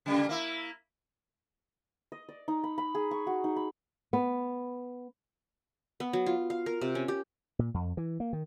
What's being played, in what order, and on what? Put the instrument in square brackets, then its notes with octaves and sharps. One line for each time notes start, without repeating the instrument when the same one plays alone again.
[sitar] C#3 G3 A#3
A#3 E4
[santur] D#5
D5
D#4
B5
B5
G#4
C#6
F#4
D#4
B5
[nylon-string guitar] B3
[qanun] B3
F#3
F4
F5
A#4
C3
C#4
G4
[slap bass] A#2
F2
E3
A#3
D#3